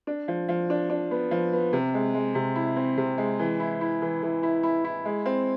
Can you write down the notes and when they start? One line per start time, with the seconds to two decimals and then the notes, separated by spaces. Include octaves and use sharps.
0.07 D4
0.28 F3
0.49 F3
0.70 D4
0.90 D4
1.11 B3
1.31 F3
1.53 B3
1.73 C3
1.94 G#3
2.15 G#3
2.35 C3
2.56 E4
2.76 C4
2.97 C3
3.18 G#3
3.39 E3
3.60 E4
3.81 E4
4.02 E3
4.23 E3
4.43 E4
4.63 E4
4.84 E4
5.05 G#3
5.26 C4